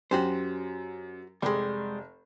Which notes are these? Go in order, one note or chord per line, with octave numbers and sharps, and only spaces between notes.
F#2 F#4 G4 C5
F1 G3 G#3